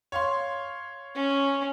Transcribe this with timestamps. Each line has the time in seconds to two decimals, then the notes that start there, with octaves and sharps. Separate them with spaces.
0.12 C#5 F5 C6
1.15 C#4